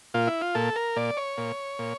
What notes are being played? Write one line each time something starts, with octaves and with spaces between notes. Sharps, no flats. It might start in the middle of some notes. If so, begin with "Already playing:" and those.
A#2 F4
E4
F4
A#2 A4
A#4
A#2 D5
C#5
A#2
A#2